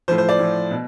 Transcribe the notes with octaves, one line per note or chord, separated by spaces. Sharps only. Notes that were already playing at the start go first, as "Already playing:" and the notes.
A2 F3 C5
C5
D5
A2 F3
B2